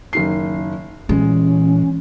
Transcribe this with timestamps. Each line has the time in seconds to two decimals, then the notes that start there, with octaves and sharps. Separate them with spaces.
0.13 F#1 D#3 C7
1.09 A#2 E3 G#3 C#4